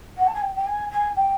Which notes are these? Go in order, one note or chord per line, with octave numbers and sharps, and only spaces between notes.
F#5
A5
G#5
G5
G5
G#5
G#5
G5